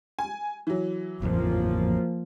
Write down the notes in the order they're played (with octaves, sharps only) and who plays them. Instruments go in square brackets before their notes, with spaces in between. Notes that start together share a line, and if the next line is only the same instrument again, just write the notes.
[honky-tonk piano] G#5
E3 F#3
[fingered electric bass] A1 F2 [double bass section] F3 A#3